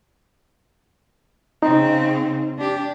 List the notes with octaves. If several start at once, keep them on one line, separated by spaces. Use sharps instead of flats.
C#3 C4 D#4
D4 G4